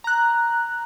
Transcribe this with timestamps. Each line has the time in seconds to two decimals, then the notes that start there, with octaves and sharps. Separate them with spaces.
0.04 A#5 F#6